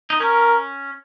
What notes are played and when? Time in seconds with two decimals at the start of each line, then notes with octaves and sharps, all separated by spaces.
0.10 D#4
0.20 C#4 A#4